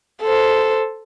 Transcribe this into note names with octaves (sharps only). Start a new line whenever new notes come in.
A4 C5